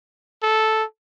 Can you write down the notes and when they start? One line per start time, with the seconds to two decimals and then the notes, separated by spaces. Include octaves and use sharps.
0.42 A4